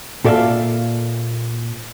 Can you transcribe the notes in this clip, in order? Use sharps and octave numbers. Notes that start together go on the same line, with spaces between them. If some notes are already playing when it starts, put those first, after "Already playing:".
A#2 A4 D5 E5 F5